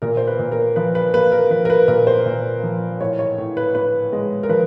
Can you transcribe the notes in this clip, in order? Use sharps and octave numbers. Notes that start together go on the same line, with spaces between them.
A#2 A#4
C5
B4
A#2
A#4
F3 B4
B4
A#3 B4
A#4
F3 B4
A#4
B4
A#2 A#4
C5
A#2
F3
A2 C#5
C#5
A2
B4
A2 B4
G#3
A#4
F3 B4